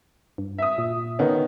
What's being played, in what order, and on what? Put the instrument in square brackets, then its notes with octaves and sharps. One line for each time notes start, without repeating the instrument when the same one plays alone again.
[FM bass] G2
[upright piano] E5 D#6
[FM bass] A#2
[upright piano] D#3 B3 C#4